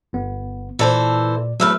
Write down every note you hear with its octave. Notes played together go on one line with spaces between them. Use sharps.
G1 B3
A#2 E3 A4 C5 D5
E2 F#3 A3 B4 E6 F6